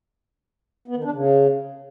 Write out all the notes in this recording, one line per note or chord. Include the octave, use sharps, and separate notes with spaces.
B3
D#3
D4
C#3